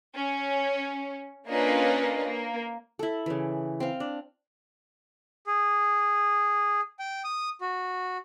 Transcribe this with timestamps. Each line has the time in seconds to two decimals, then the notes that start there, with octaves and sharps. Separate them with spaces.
0.15 C#4
1.47 A#3 C#4 D4 F4 B4 D#5
2.25 A#3
2.99 E4 A4
3.26 C#3 E3
3.80 C4 F5
4.00 D4
5.47 G#4
6.99 G5
7.24 D#6
7.61 F#4